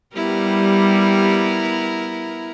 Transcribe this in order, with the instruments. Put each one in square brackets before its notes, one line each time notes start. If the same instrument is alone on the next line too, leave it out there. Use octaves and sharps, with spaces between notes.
[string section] G3 [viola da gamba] B3 E4 A#4